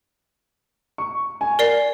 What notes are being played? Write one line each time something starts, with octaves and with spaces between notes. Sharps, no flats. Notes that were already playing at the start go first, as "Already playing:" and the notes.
C#6
G#5
A#4 D5 C7